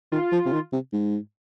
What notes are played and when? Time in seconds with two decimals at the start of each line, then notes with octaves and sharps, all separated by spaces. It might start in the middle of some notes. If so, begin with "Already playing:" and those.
0.12 D#3 F4
0.32 F3
0.46 C3
0.52 D#3
0.73 C3
0.93 G#2